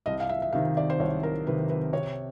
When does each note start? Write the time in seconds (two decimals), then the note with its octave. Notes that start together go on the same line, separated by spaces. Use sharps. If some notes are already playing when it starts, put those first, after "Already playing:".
0.06 C2 D#5
0.20 F5
0.29 E5
0.42 E5
0.53 C3 D#3 F5
0.77 D5
0.90 C5
1.00 C2 C#5
1.23 A#4
1.47 C3 D#3 B4
1.70 B4
1.93 C3 C#5